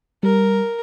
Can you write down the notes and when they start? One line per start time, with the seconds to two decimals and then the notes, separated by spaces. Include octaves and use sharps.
0.23 G3 A#4